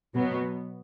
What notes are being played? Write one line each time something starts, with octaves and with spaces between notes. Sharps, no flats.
B2 F#3 B3